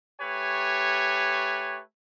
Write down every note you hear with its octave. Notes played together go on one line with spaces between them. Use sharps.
A3 G4 B4 C#5 G#5